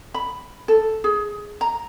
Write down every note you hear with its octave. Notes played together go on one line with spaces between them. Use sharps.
B5
A4
G#4
A#5